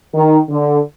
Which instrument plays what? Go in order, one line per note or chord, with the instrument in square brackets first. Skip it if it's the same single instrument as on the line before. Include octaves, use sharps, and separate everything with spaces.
[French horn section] D#3
D3